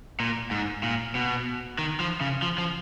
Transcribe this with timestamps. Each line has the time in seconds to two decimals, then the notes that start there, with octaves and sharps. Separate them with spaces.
0.20 A#2
0.51 G#2
0.83 A#2
1.15 B2
1.78 D#3
2.00 F3
2.21 C#3
2.42 F3
2.58 F3